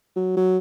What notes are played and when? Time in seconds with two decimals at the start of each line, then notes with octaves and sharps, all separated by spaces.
0.16 F#3
0.37 F#3